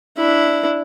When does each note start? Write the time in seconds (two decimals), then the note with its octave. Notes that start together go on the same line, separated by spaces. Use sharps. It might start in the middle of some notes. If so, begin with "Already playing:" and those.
0.17 D4 E4